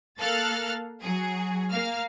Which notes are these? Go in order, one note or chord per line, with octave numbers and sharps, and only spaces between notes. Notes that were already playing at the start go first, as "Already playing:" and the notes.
A#3 A4 F5 F6 F#6 A6
F#3 G#4
A#3 F5 F6